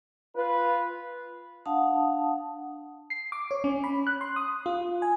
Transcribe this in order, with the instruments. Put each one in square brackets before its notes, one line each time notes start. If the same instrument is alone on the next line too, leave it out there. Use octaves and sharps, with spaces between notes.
[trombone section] F4 B4
[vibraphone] D4 F5 F#5 A5 D#6
[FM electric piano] C7
D6
C#5
C#4
B5
F#6
C6
D#6
F4
G#5